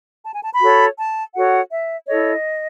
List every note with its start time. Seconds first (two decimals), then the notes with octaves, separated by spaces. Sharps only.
0.25 A5
0.34 G#5
0.43 A5
0.53 B5
0.61 F#4 A4 C#5
0.98 A5
1.35 F#4 A4 C#5 F#5
1.71 E5
2.07 E4 A4 C#5 D#5